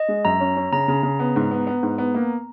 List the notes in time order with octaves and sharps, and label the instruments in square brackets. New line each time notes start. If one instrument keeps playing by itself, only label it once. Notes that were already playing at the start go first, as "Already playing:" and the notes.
Already playing: [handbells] D#5
[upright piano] G#3
[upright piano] F#2 [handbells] A#5
[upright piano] C#4
C#4
[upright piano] C#3 [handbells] A#5
[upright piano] C#3
C#3
B3
G#2
B3
B3
G#2
B3
A#3